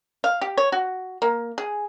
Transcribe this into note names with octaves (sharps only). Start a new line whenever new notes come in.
F5
G4
C#5
F#4
A#3
G#4